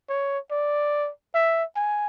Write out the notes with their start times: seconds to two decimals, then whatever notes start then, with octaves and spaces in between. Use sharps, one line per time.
0.09 C#5
0.51 D5
1.35 E5
1.76 G#5